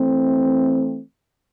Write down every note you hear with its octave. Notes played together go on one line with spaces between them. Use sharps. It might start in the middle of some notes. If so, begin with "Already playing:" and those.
Already playing: E3 A3 C4